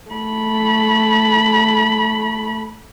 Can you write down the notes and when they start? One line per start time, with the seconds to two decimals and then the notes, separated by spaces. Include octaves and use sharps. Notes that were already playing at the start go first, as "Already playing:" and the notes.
0.10 A3 B5